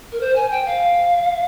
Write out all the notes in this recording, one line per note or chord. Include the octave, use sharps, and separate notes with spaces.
A#4
C5
G#5
G5
F5